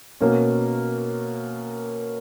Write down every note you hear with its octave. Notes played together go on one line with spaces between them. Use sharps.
B2 A#3 C#4